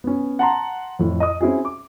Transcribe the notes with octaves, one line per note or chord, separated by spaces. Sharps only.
B3 C#4
F#5 A5 A#5 C6
F2 A2
D#5 D#6
C4 C#4 E4 F#4 G#4
D6